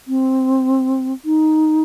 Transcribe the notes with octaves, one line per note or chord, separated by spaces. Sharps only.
C4
D#4